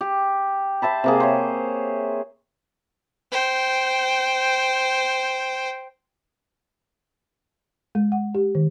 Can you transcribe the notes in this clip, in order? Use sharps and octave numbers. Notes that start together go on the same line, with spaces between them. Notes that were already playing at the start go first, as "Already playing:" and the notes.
G4
C5 E5 A5 B5
C3 A#3 G#4
C5 C#5
C5 G5
G#3
F#5
G4
D#3